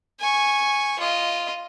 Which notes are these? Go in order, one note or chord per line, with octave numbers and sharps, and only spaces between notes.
G#5 C#6
F4 D#5